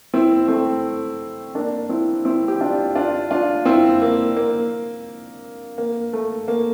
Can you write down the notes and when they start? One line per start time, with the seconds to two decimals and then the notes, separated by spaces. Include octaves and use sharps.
0.14 C4 E4
0.48 A3 C4
1.55 A#3 D4
1.89 C4 E4
2.25 C4 E4
2.48 G4
2.61 D4 F4
2.95 D4 F4
3.31 D4 F4
3.65 C4 E4
4.02 A#3
4.37 A#3
5.78 A#3
6.13 A3
6.48 A#3